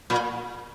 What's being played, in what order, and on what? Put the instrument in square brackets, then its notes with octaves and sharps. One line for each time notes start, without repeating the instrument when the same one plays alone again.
[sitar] A#2